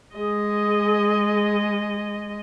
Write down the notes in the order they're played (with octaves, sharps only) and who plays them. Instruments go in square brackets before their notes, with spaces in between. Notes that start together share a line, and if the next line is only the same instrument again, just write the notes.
[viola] G#3 D#5 [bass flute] G#4